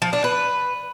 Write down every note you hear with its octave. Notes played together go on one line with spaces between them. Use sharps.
F3
D4
B4